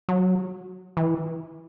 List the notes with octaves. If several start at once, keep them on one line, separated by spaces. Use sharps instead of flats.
F#3
E3